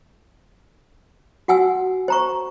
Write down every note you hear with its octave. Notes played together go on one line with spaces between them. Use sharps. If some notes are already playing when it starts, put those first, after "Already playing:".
F#4 F#5 G#5 E6
C5 A#5 C#6